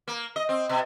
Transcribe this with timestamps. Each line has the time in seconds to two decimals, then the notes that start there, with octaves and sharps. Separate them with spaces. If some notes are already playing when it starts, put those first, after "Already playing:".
0.08 A#3
0.36 D#5
0.49 C4
0.69 B2